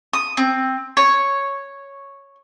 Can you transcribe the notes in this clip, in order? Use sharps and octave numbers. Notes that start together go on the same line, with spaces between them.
D#6
C4
C#5